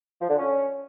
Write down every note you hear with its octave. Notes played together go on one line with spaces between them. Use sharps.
F3
D3
C#4